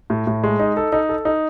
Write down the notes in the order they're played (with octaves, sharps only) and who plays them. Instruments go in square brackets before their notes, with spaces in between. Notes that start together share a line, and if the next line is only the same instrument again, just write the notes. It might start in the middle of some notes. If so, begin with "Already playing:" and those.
[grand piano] A2
A2
G#3
D#4
A4
D#4
A4
D#4